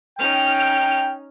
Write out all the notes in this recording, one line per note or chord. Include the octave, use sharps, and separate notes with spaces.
C#4 D#4 G5 F6